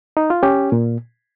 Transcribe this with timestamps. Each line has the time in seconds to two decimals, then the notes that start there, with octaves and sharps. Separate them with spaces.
0.17 D#4
0.30 F4
0.43 C#4 G4
0.72 A#2